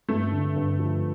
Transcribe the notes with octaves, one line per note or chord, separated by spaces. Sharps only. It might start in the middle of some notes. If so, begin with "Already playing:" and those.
G2 A3
D3
G2
F3